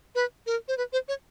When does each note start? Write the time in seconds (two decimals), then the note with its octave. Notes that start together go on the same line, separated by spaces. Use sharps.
0.15 B4
0.46 A#4
0.68 C5
0.77 B4
0.93 C5
1.08 C#5